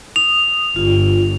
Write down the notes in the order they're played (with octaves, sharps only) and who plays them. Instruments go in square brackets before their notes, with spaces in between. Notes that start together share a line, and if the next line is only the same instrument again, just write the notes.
[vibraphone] D#6 [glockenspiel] F7
[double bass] G1 [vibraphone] F4